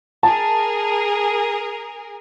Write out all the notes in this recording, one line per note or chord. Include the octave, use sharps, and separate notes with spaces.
G#4 A#4 A5